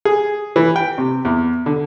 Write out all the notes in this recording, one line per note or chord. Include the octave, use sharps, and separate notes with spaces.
G#4
E3
G5
C3
E2
D3